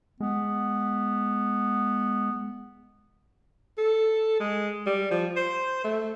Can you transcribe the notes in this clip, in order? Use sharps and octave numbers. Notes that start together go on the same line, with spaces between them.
G#3 B3
A4
G#3
G3
F3
C5
A3